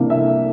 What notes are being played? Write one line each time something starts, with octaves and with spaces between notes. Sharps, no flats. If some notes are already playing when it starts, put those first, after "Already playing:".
Already playing: C2 C3 E3 A#3 D4
E5